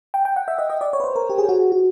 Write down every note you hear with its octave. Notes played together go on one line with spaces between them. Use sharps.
G5
G5
F#5
E5
D#5
D#5
D5
C#5
B4
C5
A#4
G4
G#4
F#4
F#4